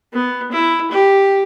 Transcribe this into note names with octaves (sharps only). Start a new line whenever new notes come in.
B3
E4
G4